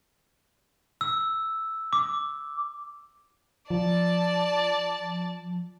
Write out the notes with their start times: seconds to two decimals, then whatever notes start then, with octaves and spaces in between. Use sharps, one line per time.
1.01 E6
1.93 D6
3.70 F3 D5 A5